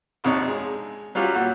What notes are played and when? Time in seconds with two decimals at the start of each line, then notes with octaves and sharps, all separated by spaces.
0.24 A#1 F2 C3 D4 D#4 C#5
0.47 G#3
1.15 F#3 G3 C#4 F4 G4
1.35 A#2 G3 F#4